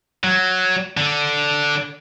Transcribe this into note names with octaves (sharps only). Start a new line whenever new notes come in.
F#3
D3